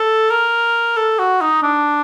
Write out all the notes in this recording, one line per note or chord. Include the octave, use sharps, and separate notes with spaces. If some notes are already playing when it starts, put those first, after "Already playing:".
Already playing: A4
A#4
A4
F#4
D#4
D4